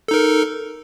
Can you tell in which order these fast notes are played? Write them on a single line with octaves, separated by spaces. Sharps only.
A4 D#4 A#4